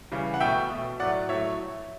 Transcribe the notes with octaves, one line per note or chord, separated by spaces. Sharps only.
C#3 E3 G3
F#5
B2 A3 E5 G5
B2 A3
A2 F#3 A3 D5 F#5
A2 F#3 A3 C#5 E5